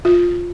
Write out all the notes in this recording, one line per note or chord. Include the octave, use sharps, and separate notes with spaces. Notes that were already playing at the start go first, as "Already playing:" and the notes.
F4